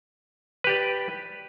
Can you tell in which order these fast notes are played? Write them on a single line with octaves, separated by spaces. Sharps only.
B4 G4 D5